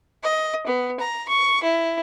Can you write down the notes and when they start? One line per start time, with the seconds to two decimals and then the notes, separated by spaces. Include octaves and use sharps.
0.23 D#5
0.65 B3
1.00 A#5
1.29 C#6
1.63 E4